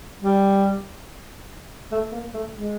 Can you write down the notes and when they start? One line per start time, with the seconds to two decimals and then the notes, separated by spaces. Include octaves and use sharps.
0.22 G3
1.91 A3
2.12 A#3
2.34 A3
2.54 G#3